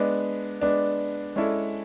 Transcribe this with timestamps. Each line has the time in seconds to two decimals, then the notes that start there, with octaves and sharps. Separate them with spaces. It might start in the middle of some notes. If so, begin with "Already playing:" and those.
Already playing: G#3 B3 D4
0.61 G#3 B3 D4
1.36 G#3 C#4 E4 A4 D5